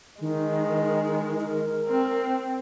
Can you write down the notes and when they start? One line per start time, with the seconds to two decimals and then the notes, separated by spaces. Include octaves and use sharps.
0.21 D#3 G#3
1.40 A#4
1.88 C4